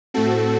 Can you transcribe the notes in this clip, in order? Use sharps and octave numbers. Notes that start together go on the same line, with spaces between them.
A2 A3 C4 F#4 A4